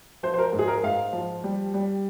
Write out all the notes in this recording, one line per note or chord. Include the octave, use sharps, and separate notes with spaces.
F3 C5
C5
A#4
G#2
G#4
A#4
G#2 F5
F3
G3
G3